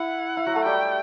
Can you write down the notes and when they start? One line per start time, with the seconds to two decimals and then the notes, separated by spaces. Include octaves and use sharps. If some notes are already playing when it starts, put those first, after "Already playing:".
Already playing: E4 F#5
0.37 E4
0.46 F#3 F#4
0.56 A3 A4
0.65 G3 G4 G5